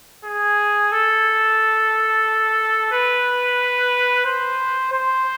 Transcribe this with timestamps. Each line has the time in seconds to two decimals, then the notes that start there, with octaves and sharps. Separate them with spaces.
0.24 G#4
0.92 A4
2.92 B4
4.25 C5
4.92 C5